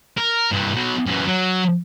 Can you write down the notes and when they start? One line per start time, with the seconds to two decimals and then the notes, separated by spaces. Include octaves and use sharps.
0.17 A#4
0.51 G2 E3
0.74 B2 F#3
1.07 F#2 E3
1.28 F#3